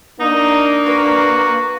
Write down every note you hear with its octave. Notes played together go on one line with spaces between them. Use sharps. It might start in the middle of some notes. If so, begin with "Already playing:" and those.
A#3 D4 D#4
F#4 B4